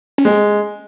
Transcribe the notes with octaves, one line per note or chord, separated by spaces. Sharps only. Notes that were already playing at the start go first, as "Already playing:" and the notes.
C#4
G#3 C4